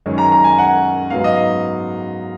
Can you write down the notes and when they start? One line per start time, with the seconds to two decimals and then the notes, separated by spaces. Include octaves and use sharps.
0.06 F#2 D#3 G#3 C#4
0.18 A#5
0.32 A#5
0.44 G#5
0.58 F#5
1.10 G#2 F#3 B3 F5
1.24 D#5